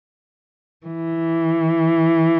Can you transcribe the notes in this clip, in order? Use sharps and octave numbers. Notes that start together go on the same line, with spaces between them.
E3